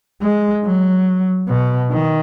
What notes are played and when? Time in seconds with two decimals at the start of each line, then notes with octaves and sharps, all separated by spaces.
0.22 G#3
0.64 F#3
1.48 B2
1.92 D#3